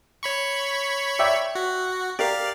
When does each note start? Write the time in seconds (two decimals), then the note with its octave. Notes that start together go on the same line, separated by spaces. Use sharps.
0.23 C#5 B5 C#6
1.19 D5 E5 G5
1.55 F#4
2.19 G4 A#4 D5 F5